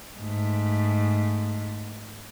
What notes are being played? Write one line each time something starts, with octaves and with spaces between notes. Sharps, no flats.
G#2 A3